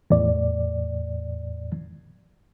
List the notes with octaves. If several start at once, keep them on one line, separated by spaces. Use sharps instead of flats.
E2 A2 D5